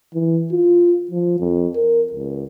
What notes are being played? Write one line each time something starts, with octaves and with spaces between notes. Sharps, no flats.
E3
F4
F3
F2
A#4
C#2